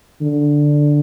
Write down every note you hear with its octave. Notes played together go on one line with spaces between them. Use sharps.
D3